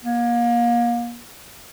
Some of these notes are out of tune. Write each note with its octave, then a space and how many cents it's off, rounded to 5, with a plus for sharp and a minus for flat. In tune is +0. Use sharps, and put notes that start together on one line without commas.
A#3 +30